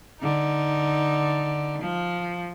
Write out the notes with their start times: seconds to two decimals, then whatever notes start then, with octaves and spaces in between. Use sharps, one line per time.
0.20 D3 D#4
1.82 F3